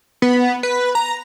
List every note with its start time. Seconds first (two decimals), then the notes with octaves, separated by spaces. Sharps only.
0.22 B3
0.63 B4
0.95 A#5